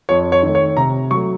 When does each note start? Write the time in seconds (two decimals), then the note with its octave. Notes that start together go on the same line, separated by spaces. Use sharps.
0.09 F2 C#5
0.32 C#5
0.43 D#3 A3
0.55 C#5
0.77 C3 A#5
1.11 F#3 A3 C#6